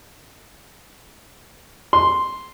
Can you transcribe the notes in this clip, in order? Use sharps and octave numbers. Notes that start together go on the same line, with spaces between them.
C6